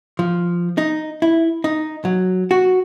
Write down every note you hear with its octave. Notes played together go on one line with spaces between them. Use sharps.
F3
D#4
E4
D#4
F#3
F#4